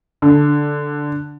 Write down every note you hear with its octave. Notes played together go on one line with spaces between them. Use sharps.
D3